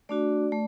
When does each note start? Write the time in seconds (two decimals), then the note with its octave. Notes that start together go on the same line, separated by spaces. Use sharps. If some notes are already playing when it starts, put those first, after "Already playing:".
0.09 A3 D4 F#4 D5
0.52 A3